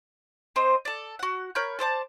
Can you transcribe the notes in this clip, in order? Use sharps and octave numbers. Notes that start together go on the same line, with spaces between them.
C4 C5 D#5
A4 D5
F#4 F#5
A#4 C#5 B5 G6
A4 C5 D5 A5